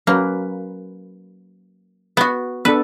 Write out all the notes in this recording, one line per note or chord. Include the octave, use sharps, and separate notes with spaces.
F#3 A#3 C#4 B4
B3 F#4
B3 D4 A4 B4